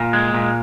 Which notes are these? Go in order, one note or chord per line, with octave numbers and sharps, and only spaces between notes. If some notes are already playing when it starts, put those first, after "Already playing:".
Already playing: A#2
G#3
A#2